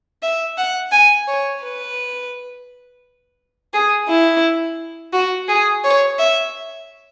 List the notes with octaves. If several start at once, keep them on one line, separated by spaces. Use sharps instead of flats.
E5
F#5
G#5
C#5
B4
G#4
E4
F#4
G#4
C#5
E5